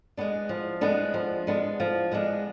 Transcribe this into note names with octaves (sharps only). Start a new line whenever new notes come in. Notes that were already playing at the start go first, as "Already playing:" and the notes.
G#3 B3 D4
F3
G#3 B3 D4
F3
G#3 B3 D4
F3
G#3 B3 D4